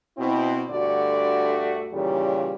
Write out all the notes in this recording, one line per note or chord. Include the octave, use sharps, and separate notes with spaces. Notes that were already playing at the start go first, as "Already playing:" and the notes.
B2 C4 E4
D2 G2 D3 A3 F#4 D5
D#2 A#2 C#3 E3 G3